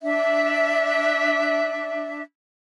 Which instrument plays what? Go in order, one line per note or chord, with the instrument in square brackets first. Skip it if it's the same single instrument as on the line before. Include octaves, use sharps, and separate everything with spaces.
[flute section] D4 E5